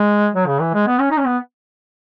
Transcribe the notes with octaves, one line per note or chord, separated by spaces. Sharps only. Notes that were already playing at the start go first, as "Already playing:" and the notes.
Already playing: G#3
F#3
C#3
E3
G#3
B3
C#4
D#4
C#4
B3